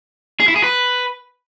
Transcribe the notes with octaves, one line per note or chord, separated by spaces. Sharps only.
G#4
E4
G#4
B4